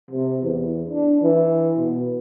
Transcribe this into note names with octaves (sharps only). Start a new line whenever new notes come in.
C3
E2
D4
E3
B2